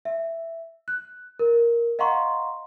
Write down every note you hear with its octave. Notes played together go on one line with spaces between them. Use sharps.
E5
F#6
A#4
D#5 F5 F#5 A#5 C6 C#6